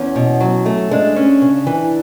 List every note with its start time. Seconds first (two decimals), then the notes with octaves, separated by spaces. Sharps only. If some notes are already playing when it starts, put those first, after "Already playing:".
Already playing: E2 C#4
0.16 B2
0.40 F#3
0.66 A3
0.91 G#3 D4
1.16 C#4
1.42 C#3
1.67 E3